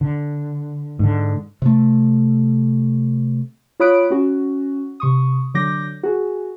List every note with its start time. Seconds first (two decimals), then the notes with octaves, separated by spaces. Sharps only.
0.01 D3
0.99 G#2 D3
1.62 C3 A3
3.80 F4 C#5 B5 D#6 F#6 D7
4.10 C#4 F#4
5.00 C3 C#6 D#6
5.54 D3 F#3 D6 G6 A#6
6.03 F#4 G#4